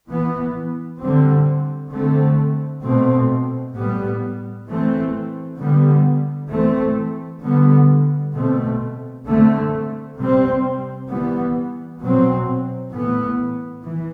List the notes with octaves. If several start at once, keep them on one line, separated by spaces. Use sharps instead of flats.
E3 B3
D3 G3 C4
D3 A3 C4
B2 A3 C4
A2 G3 B3
E3 A3 C4
D3 G3 B3
E3 A3 C4
D3 G3 B3
B2 A3 C4
D3 A3 C4
C3 G3 C4
E3 G3 B3
B2 F#3 C4
A2 E3 B3
E3